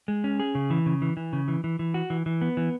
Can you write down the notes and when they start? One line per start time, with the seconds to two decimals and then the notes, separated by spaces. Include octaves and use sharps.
0.08 G#3
0.24 C#4
0.40 G#4
0.55 C#3
0.70 E3
0.86 C#3
1.02 E3
1.17 E3
1.33 C#3
1.48 E3
1.64 E3
1.79 E3
1.94 F#4
2.10 E3
2.26 E3
2.42 B3
2.57 E3